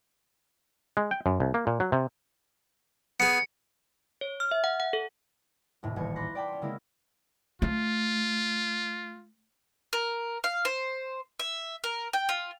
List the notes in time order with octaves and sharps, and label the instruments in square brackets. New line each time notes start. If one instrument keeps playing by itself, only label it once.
[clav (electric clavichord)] G#3
G5
F#2
C2
A#3
A#2
F#3
C3
[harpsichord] B3 G#4 [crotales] C#7
[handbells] C#5
F6
E5
F#5
F#5
A4
[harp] D#2 A2 C3
D#1 A1 A2 G#6 C#7
B5 C6 D6 F#6 A#6 C7
D5 F#5 G5 A5 B5 D6
C#4 C6
C#3 G#3 A#3 C4 E4 A#4
[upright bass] A3 [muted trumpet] F4
[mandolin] A#4
F5
C5
E5
A#4
G5
F4